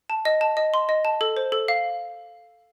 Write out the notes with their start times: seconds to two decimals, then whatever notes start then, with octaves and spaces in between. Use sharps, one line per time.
0.10 A5
0.25 D#5
0.41 A5
0.57 D#5
0.74 C6
0.89 D#5
1.05 A5
1.21 A4
1.37 C5
1.52 A4
1.68 F5